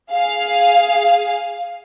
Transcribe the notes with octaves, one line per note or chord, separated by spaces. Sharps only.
G#4 F5